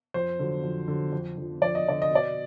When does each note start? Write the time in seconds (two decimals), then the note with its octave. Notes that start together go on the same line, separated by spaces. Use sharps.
0.14 F2 C5
0.39 D3 F#3
0.64 F2
0.88 D3 F#3
1.13 F2
1.37 D3 F3
1.62 F2 D5
1.75 D#5
1.86 D3 F3 D5
2.02 D#5
2.11 B2 D5